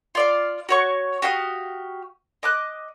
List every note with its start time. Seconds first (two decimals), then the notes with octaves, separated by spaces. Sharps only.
0.15 F4 D5 F5
0.69 F#4 C#5 C#6
1.22 F#4 G4 F5 D#6
2.43 D#5 D6 F#6